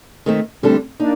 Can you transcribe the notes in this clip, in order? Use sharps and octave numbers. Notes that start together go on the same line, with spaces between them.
D#3 A3 C4
D3 G3 A3 C4 D4 A4
A#3 D4 D#4